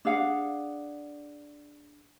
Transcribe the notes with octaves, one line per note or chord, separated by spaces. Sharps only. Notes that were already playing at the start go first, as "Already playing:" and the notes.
D4 G#4 F5 F#5